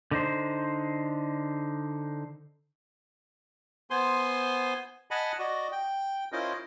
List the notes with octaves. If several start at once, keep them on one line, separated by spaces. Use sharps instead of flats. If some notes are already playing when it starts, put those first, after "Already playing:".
D3 D#4 C5
B3 C5 G#5 C6
D#5 F#5 G#5 A5 B5
F#4 D5 D#5
G5
C#4 E4 F4 A#4 C5 D#5